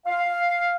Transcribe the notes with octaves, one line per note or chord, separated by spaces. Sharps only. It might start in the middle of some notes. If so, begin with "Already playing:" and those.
F5